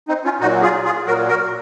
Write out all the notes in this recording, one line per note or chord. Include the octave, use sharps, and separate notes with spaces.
C4 D#4
C#4 F4
A#2 F#3 D#4 F#4
F4 G#4
F4 G#4
A#2 F#3 F#4 A#4
F#4 A#4